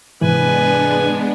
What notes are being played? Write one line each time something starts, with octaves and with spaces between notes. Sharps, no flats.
G#2 C3 E3 G#3 B3 D4 B4 G#5